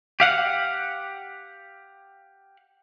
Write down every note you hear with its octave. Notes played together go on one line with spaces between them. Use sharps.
G4 F5 F#5